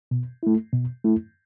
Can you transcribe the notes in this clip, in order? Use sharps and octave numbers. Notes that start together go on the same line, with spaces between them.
B2
A3 E4
B2
A3 E4